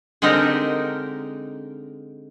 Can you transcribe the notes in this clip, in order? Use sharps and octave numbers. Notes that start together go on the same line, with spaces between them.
D3 G#3 C4 D#4 G4 A#4